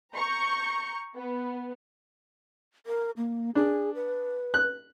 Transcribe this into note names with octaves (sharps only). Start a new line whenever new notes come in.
A#5 C#6 G6
B3
A#4
A#3
D4 G#4
B4
F#6